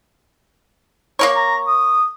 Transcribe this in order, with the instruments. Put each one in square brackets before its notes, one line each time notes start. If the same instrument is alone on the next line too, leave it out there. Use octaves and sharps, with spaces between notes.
[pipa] A#3 A#4 C#5
[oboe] A#5
D#6